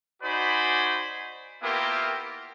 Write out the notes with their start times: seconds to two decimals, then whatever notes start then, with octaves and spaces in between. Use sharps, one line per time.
0.22 D#4 F#4 C5 D5 G#5 B5
1.62 A#3 B3 E4 F4 G4 A#4